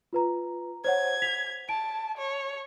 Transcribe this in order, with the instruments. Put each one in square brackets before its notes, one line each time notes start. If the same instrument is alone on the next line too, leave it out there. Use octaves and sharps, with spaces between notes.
[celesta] F4 B4 A#5
[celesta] C5 C#5 F#5 [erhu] G#6
[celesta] B6 F7
[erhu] A5 [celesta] D7
[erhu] C#5